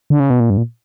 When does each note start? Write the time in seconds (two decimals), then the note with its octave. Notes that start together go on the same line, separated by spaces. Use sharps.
0.10 D3
0.20 C#3
0.30 B2
0.40 A#2
0.50 G2
0.57 A#2